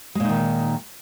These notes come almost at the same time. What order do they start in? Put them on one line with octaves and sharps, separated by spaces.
G#3 A#2 D#4 D#3